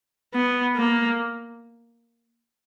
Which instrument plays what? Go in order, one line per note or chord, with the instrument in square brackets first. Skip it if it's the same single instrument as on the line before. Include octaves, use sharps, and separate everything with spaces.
[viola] B3
A#3